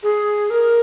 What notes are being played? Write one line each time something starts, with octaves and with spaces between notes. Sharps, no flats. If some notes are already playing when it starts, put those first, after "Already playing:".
G#4
A#4